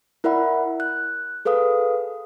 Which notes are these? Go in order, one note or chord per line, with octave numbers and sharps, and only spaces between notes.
E4 A#4 D5 E5 F#5 B5
F#6
G#4 A4 B4 F5 D#6